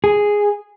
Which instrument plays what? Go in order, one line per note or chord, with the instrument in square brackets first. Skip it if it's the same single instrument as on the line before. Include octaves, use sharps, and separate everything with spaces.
[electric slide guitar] G#4